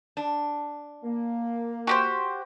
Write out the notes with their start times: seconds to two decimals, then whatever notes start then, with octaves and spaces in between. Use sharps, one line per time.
0.17 D4
1.04 A#3
1.87 F#4 G4 C5